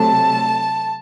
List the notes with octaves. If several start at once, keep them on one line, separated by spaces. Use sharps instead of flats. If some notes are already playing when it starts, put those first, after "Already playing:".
Already playing: C3 F#3 A3 A5